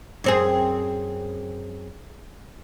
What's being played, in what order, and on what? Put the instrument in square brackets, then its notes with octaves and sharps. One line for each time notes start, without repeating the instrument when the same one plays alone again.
[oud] F#2 C4 G#4